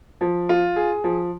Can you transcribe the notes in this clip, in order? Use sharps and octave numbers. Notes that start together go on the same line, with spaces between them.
F3
F4
G#4
F3